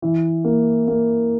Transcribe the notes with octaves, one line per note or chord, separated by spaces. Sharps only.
E3
A#3
A#3